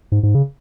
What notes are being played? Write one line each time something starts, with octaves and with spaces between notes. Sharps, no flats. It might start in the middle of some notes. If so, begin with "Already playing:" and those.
G#2
G#2
C#3